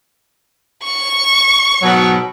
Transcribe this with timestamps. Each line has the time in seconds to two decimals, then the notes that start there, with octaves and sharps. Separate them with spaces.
0.84 C#6
1.80 G#2 B2 F#3